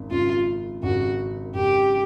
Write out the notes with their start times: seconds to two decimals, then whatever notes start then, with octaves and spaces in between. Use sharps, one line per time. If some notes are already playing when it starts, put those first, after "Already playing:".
Already playing: G#1 F#2
0.11 G#1 F#2 C#3 F4
0.83 G#1 F#2 C#3 F#4
1.55 G#1 F#2 C#3 G4